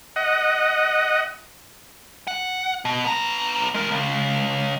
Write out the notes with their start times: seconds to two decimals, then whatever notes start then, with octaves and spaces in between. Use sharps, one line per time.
0.16 D#5 F#5
2.27 F#5
2.85 B2
3.05 B3 A#5
3.74 G#3 A#4
3.91 C#2